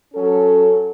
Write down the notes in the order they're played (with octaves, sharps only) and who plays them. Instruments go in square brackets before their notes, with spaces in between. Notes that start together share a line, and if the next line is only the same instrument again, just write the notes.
[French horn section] F#3 C#4 A4